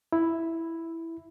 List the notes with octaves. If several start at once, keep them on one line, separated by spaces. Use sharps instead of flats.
E4